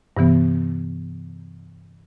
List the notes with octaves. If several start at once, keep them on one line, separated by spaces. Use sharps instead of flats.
G2 C3 E3 B3